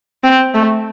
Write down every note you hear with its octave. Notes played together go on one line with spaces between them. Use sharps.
C4
A3